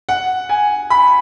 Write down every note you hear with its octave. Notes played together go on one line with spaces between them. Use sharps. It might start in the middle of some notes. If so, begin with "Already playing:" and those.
F#5
G#5
B5